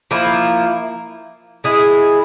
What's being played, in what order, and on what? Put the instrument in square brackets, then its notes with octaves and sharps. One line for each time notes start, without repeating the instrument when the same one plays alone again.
[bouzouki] F3 A#3 E4
G#3 E4 G#4